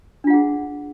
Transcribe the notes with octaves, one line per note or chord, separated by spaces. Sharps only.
D4 F4 G#4 F#5